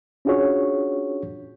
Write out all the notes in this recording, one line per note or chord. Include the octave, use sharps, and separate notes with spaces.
C#4 D4 F4 F#4 G#4 C#5